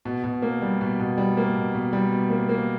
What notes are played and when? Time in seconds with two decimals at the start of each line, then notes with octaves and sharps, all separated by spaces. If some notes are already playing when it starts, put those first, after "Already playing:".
0.05 B2
0.24 B2
0.42 A#3
0.62 G3
0.81 B2
0.99 B2
1.18 G3
1.37 A#3
1.56 B2
1.74 B2
1.93 G3
2.12 B2
2.30 A#3
2.49 A#3